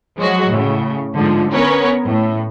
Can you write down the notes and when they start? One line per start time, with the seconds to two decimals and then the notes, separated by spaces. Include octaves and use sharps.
0.18 F3 F#3 G#3 F#4
0.50 A2 C#3
1.14 G#2 D3 F3
1.51 B3 C#4 A#4 B4 C#5
2.05 A2